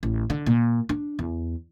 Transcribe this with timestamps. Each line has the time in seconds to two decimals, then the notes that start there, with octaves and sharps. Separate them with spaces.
0.03 A1
0.30 D3
0.46 A#2
0.89 D4
1.19 E2